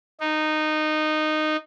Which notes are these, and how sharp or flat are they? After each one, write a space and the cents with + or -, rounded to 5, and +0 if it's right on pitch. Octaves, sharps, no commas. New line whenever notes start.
D#4 -15